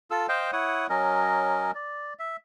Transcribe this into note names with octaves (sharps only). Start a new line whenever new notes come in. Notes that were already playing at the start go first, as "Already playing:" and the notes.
F4 A4 E6
C5 D#5 F5 G5
E4 C#5 F#5 D#6
F#3 C#4 A#4 D#5
D5
E5